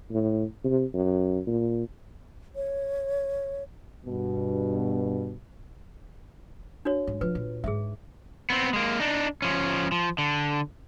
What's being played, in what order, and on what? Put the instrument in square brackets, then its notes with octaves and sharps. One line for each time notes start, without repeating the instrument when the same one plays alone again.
[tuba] A2
C3
F#2
A#2
[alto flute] C#5
[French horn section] G2 B2
[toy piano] D4 F#4 C#5
[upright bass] G#2
[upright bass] F3 [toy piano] B4
[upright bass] A#2
[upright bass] G#2 D#4 [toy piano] G#4 E5
[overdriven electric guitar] B3 C4
G#3 A#3
D4 D#4
F3 C#4
F3
D3